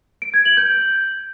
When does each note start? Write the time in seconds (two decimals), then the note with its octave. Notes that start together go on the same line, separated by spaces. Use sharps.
0.22 D7
0.34 G#6
0.45 F#7
0.57 G6